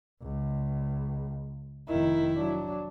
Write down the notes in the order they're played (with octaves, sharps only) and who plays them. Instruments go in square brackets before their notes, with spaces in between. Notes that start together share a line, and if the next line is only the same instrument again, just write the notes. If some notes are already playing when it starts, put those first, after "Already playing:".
[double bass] C#2
[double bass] F1 D#3 [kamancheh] E4
[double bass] F#3 D4